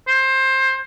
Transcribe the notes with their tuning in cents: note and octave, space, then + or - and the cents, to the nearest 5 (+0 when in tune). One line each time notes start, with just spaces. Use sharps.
C5 +20